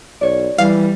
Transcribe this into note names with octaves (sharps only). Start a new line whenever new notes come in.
B1 C#5 D5
E3 G3 F5